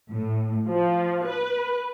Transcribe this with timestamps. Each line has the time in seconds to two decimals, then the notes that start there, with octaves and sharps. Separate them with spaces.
0.10 A2
0.67 F3
1.26 B4